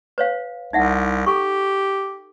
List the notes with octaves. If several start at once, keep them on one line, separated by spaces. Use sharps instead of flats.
B4 C#5 F5
C2 D#4 E5 F#5
G4 A4 C#6